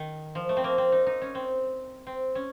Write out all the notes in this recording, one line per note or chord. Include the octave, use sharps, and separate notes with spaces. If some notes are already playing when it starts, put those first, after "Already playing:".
Already playing: D#3
F3
A3
C4
A#3
C4
D#4
D#4
C#4
C4
C4
C#4